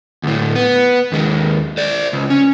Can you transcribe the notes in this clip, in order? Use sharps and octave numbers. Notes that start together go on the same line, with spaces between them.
D2 A2
B3
D#2 G#3
C5 D5
C#2
C#4